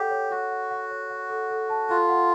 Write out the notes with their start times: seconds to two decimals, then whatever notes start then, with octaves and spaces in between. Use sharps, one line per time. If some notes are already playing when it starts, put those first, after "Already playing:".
Already playing: G4 A4 C#5 F#5
0.11 C#5
0.31 F#4 F#5
0.51 F#5
0.70 F#5
0.91 C#5
1.10 F#5
1.30 A4
1.50 A4
1.69 A5
1.89 F4 A4
2.09 F#5